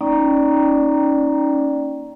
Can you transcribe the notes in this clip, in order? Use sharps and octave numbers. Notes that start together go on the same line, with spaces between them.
A#3 C#4 D#4 D5 G5 A#5